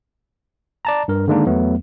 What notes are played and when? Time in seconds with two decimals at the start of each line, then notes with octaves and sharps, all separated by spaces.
0.85 D5 A5 A#5
1.08 G2 A#4
1.28 D3 D#3 G#3 A#3 D4 D#4
1.46 E2 F#3 A3 B3